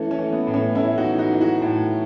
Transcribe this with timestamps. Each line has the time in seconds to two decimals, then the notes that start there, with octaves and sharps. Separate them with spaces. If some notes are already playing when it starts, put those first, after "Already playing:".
Already playing: E3 A3 C#4
0.11 A3 C#4
0.19 E3
0.32 B3
0.47 A2
0.54 A3 C#4
0.75 A2 C#4 E4
0.98 D#4 F#4
1.04 E3
1.18 D#4 F#4
1.33 E3
1.40 D#4 F#4
1.62 A2